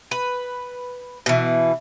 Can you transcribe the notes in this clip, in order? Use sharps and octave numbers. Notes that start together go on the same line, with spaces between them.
B4
B2 E3